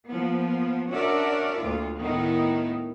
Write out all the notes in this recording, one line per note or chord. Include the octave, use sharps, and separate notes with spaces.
F3 A#3 B3
C#4 D4 F#4 A#4 D5 E5
D2 A2 A#3 F4
A2 D#3 B3 D#4 E4